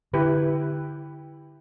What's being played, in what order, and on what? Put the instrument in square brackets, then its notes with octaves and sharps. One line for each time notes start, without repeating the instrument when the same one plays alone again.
[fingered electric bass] D3 [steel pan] E4 G4 B4